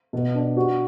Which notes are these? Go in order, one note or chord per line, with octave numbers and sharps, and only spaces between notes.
B2
D4
F#4